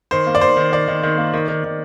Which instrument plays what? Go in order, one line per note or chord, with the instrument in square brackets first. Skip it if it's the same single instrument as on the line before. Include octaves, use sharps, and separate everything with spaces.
[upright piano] D#3 C5
A#3
D5
D#3 C5
D#3
D#3 D5
D#3
D#3
A#3
D#3
D#3
D#3